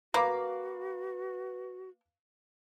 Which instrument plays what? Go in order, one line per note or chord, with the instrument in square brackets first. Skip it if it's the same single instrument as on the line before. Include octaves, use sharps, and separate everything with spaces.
[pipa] A#3 [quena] F#4 [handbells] B4 [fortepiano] F5 B5 D6